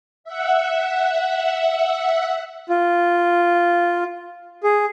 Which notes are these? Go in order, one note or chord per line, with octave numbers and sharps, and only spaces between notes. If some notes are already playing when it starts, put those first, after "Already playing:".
E5 F#5
F4
G#4